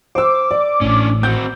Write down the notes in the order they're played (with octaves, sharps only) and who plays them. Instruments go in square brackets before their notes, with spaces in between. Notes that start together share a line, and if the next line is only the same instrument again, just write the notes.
[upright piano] C5 E6 [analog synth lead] D6
[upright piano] D5
[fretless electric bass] A1 A2 [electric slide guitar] C#4 D4
[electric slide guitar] C4 F#4 [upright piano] G6